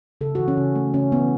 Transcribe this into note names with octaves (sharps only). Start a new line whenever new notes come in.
C#3 A4
F#4
E3
C#4
C#3
A3
C#3 C#4
E3 B3